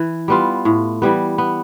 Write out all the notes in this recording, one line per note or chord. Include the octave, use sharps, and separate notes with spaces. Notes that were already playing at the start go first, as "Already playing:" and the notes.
Already playing: E3
G3 B3 F4
A2
E3 G3 B3
B3